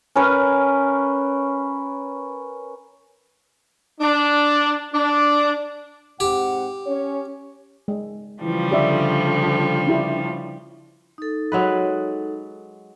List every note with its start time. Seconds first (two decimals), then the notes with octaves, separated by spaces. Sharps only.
0.16 C#4 A#4 B4
4.01 D4
4.93 D4
6.20 G#2 C4 G4 F#5
6.87 C#4 C#5
7.88 G#3
8.42 C#3 E3 F3 G3
8.72 D3 G4 D5 E5
9.87 D4 E4 G4
11.18 D#4 A4
11.52 F#3 G#3 B4